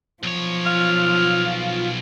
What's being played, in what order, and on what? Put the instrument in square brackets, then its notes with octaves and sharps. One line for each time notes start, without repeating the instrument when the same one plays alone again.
[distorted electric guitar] B1 C#5 [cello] F3
[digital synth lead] F4 [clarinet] F6